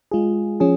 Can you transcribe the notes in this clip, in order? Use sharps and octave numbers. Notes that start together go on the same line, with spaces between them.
G#3 F4 G#4
F3 C#4 G#4